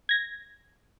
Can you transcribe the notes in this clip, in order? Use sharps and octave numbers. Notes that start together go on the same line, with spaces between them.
G#6 A#6